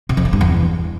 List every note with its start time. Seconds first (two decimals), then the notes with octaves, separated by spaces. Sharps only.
0.09 C3
0.17 F2
0.25 C#3
0.33 G2
0.41 E2